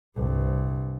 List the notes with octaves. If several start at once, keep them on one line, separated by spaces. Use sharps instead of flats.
C2 G2